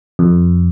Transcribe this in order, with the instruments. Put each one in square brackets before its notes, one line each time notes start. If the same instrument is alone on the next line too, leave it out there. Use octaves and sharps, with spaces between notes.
[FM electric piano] F2